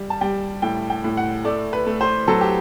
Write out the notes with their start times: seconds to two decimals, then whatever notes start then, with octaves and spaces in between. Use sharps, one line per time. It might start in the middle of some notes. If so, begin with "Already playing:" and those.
Already playing: G3
0.10 A5
0.21 G3 G5
0.62 A2 G5
0.90 G5
1.04 A2
1.17 F#5
1.45 A3 D5
1.73 B4
1.86 A3
2.01 C5
2.28 F#3 A4
2.41 G4